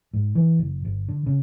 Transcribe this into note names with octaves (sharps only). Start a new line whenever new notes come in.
G#2
E3
F#1
G1
D3
C#3